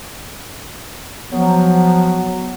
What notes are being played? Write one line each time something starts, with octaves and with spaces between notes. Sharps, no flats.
F3 F#3 B3